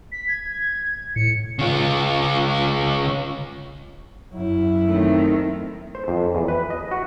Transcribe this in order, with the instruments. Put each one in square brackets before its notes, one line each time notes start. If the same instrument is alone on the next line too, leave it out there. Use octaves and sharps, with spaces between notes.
[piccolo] B6
G#6
[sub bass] A2 [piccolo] C#7
[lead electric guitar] C#3 F4
[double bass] F#2 E4
[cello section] D#3 A3 C4
[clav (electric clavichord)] C5
F2
E2
B4
D#5
F#4